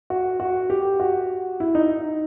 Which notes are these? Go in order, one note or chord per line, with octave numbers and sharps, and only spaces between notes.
F#4
F#4
G4
F#4
E4
D#4